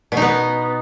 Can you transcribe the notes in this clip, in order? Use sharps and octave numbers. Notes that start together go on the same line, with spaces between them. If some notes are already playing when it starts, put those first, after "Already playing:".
B2
D#4
B3